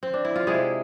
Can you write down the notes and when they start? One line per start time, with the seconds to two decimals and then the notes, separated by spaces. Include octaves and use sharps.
0.03 C4
0.14 D4
0.25 E4
0.36 F4
0.47 C3 G#3 E4 G#4